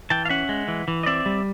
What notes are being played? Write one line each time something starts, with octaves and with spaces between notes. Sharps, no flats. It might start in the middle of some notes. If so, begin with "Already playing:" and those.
E3 G5 A5
F5
C#4 E5 F#5
G#3
E3
E3
D#5
C4 D5 E5
G3